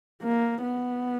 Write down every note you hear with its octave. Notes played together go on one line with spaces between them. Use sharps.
A#3
B3